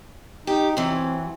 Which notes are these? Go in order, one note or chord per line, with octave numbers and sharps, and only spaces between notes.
D#4 G4
E3 F#3 C4